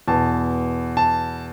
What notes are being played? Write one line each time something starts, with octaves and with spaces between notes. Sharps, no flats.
E2 B2 A5
A5